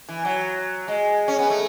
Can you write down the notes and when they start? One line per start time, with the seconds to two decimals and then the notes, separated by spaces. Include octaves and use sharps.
0.09 E3
0.25 F#3
0.88 G#3
1.28 C#4
1.39 B3
1.50 A3